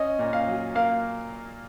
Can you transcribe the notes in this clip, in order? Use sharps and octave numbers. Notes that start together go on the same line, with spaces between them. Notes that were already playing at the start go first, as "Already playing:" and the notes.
Already playing: C#4 D#5
A#2
F5
F#3
A#3 F5